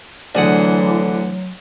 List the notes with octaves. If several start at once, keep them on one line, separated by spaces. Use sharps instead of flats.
D2 D3 E3 F#3 D4 G#4 F#5